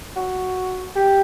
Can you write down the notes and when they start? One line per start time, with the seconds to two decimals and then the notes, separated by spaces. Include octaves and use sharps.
0.16 F#4
0.96 G4